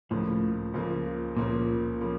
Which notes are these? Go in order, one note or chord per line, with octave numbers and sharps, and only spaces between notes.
C#2 A2 C#3 F3 A#3
C#2 C#3 F3 A#3
C#2 A#2 C#3 F3 A#3
C#3 F3 A#3